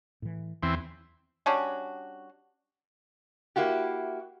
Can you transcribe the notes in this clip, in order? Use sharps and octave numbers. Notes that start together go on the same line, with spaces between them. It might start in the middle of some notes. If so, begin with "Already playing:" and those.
A2 E3
E2 E3 C4
G3 C#4 D4 F#4
A#3 E4 F#4 G4